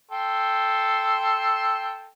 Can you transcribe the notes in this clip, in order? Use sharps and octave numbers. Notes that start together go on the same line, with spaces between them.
A4 G5 C6